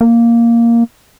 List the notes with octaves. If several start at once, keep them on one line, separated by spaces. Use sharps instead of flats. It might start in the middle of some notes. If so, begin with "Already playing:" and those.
A#3